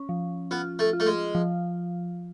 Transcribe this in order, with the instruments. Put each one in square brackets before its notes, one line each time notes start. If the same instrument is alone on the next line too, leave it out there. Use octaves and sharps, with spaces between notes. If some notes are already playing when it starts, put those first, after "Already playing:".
Already playing: [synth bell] C#4
F3
[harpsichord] B3 [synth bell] F4
[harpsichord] A3
[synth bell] F4
[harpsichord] A3
G#3
[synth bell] F3